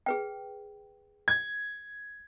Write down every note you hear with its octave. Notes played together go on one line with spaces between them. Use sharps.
G#4 B4 G5
G#6